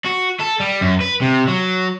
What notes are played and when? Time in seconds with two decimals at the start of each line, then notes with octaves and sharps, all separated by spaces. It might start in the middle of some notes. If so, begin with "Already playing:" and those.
0.06 F#4
0.40 A4
0.60 G3
0.81 F#2
1.00 B4
1.21 C3
1.48 F#3